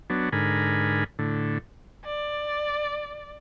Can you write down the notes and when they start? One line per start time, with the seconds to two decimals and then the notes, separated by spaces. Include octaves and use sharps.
0.10 F#3 B3 D4
0.32 G#2 D3 A#4 G#5 B5
1.19 A2 D3
2.05 D5